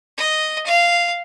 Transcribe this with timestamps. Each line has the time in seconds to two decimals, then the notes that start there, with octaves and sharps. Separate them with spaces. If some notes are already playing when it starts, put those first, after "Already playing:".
0.17 D#5
0.66 F5